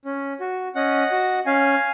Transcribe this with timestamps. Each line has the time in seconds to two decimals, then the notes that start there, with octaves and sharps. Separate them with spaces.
0.05 C#4
0.40 F#4
0.75 C#4 D#5 F#5
1.12 F#4
1.46 C#4 F5 G#5